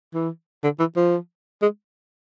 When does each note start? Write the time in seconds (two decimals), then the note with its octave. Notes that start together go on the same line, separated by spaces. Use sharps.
0.14 E3
0.64 D3
0.79 E3
0.96 F3
1.62 G#3